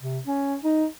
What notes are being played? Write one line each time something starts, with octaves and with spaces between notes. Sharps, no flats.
C3
C#4
D#4